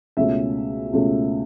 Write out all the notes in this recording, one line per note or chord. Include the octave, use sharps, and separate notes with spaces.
C#2 B2 A3 C#4 E5
C#2 B2 A3 C#4